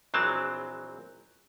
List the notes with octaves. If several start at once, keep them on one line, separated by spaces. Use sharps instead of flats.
A#1 E3 F#3 G#3 C4 A5